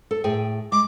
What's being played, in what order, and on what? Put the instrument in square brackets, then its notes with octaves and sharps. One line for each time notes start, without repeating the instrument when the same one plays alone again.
[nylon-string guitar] A4
A2 G#4 G5
[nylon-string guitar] G#3 [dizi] D6